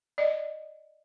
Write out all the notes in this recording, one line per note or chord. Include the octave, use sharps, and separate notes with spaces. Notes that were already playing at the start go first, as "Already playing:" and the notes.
D5 D#5